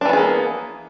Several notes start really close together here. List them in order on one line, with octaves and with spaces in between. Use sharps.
D4 E3 B3 G#4 A#3